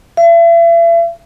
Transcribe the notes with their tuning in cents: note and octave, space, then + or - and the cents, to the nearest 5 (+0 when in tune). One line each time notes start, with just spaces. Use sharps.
E5 +40